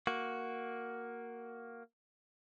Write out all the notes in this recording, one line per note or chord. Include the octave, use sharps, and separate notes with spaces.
A#3 F#4